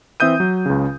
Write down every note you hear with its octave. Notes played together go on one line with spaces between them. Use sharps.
E3 C4 E5 D#6 G6 D#7
F#3
C#2 C#3